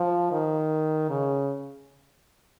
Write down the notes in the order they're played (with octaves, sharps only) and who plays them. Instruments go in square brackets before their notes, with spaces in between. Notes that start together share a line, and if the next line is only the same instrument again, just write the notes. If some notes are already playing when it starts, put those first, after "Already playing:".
Already playing: [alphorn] F3
D#3
C#3